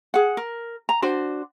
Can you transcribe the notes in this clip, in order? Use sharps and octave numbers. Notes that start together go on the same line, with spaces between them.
G#4 F#5
A#4
A#5
D4 F#4 C5